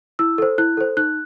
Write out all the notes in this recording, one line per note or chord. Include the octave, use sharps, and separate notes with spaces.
E4 E6
A4 C5
E4 F#6
A4 C5
D#4 F#6